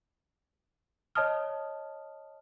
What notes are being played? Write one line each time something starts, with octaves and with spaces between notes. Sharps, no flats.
C#5 D#5 A5 D#6 F6